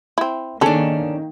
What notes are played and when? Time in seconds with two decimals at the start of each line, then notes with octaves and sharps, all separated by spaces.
0.18 C4 E4
0.61 D#3 A#3 C#4 D4 G#4 A4